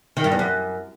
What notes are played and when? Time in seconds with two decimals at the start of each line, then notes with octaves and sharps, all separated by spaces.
0.17 D#3
0.24 G2
0.32 E2
0.39 F#2